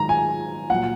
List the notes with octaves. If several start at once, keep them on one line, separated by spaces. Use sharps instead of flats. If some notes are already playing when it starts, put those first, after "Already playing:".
Already playing: G#2 D#3 F#3 A#5
G#5
A#2 F#3 F#5